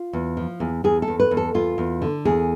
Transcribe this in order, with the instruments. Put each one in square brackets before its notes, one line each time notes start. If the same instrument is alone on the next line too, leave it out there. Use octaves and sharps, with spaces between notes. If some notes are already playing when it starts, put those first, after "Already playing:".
Already playing: [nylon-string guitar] F4
E2
F3
E2
E2 G#4
A4
E2
B4
E2
A4
E2 F4
E2
D3
E2 G#4